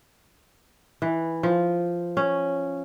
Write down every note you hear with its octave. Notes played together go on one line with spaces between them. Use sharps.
E3
F3
C#4